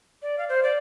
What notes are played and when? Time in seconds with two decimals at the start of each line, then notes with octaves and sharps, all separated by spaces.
0.22 D5
0.38 F5
0.49 C5
0.63 D5